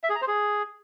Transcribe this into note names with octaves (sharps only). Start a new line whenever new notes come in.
E5
G#4
A#5
C5
G#4